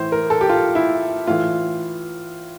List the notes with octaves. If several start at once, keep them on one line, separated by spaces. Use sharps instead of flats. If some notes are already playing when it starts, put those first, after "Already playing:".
Already playing: A2 E3 C5
A#4
A4
G4
F4
E4
A2 E3 F4